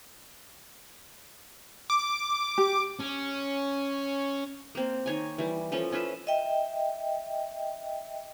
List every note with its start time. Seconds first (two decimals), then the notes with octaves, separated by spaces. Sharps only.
1.90 D6
2.58 G4
3.00 C#4
4.75 A#3 C4
5.06 D#3 C#5 G#5
5.38 E3 G3
5.72 F3 C#4 A4
5.92 C#4 F4 B4 E5
6.27 D#5 E5 G5